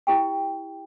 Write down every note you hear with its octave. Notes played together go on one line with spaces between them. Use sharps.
E4 G4 G5